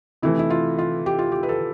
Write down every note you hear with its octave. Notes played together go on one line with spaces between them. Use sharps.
C3 E3 A3 E4
E4
F4
F4
G4
F4
G4
B4
A4